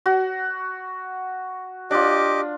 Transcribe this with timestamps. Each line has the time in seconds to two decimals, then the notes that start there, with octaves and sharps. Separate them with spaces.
0.06 F#4
1.91 D4 F4 G4 D#5 D6